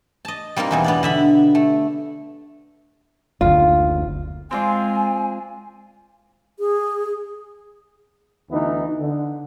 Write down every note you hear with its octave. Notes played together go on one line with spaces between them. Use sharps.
D#5 A5
G3 A#3 C4 D#4 A#4
E2 B2 E3
B3 D4 D5
D3 E5 B5
A3
F#1 D2 F4
G#3 C4 F4 D5 G#5
G#4
D2 E3 B3 D#4
D3